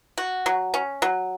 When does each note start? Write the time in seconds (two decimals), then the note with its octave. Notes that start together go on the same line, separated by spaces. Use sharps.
0.18 F#4
0.46 F#3
0.74 C#4
1.02 F#3